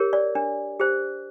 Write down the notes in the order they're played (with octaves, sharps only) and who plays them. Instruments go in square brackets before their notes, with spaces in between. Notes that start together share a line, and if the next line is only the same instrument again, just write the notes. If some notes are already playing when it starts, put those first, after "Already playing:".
Already playing: [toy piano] G4 A#4 C#5
D5
D4
G4 C5